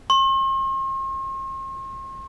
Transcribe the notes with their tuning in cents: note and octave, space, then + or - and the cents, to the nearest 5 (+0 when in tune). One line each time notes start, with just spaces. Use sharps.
C6 +45